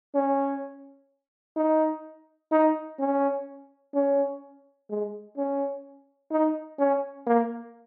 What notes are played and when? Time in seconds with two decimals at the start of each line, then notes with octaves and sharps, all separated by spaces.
0.15 C#4
1.57 D#4
2.52 D#4
2.99 C#4
3.94 C#4
4.90 G#3
5.37 C#4
6.31 D#4
6.79 C#4
7.27 A#3